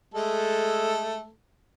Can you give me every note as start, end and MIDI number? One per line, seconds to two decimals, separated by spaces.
0.14 1.28 56
0.14 1.28 57
0.14 1.28 69